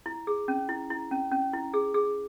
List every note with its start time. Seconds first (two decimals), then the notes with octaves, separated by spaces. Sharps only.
0.06 E4
0.27 G#4
0.48 C#4
0.69 E4
0.90 E4
1.11 C#4
1.32 C#4
1.53 E4
1.74 G#4
1.94 G#4